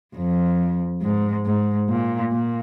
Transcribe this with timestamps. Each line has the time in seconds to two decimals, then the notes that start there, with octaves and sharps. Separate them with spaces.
0.16 F2
1.02 G#2
1.46 G#2
1.89 A#2
2.32 A#2